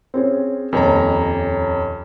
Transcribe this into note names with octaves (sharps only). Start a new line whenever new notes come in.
C4 C#4 G#4
D#1 F2 C#5 A#5